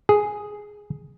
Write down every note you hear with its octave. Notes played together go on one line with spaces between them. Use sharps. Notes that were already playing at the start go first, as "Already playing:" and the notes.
G#4